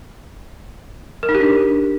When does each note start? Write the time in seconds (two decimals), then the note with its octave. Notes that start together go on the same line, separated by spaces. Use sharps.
1.23 A#4
1.29 D#4
1.35 G4
1.40 D4